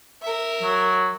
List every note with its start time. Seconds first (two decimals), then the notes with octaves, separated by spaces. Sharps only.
0.22 A#4 E5
0.62 F#3